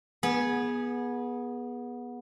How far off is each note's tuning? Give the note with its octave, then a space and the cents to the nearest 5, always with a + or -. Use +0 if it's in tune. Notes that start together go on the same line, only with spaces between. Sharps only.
B3 -20 G#4 +0